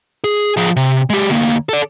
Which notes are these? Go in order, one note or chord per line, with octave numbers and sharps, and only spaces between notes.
G#4
F3 G#4
C3
G#3 G4
D2 A#3
A4 D5